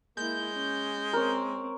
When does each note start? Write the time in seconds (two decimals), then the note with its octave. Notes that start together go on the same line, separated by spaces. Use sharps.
0.17 G#3 A#3 E4 G6
0.53 C#4
1.13 C4 A#4 C#5